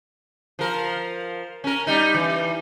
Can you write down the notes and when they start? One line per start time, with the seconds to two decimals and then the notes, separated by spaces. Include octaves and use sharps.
0.59 F3 A#4
1.64 C#4 A#4
1.87 G3 D#4
2.14 E3